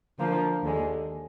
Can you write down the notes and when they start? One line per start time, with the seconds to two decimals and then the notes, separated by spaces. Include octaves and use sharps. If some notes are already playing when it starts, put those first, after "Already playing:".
0.19 D3 F3 A#3 F4
0.63 D#2 D3 G#3